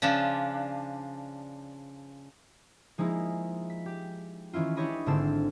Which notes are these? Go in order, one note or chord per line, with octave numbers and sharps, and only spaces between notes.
C#3 F3 D4
F3 G#3 A#3 D#4 E4
B6
G4
D#3 E3 C#4 E4 F4
D4 E4 G4 C#5 D#5 B5
G#1 D3 C4 A4 E6